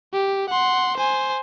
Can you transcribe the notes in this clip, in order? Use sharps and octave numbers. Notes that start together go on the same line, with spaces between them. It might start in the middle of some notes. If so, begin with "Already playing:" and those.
G4
F#5 C6
C5 G#5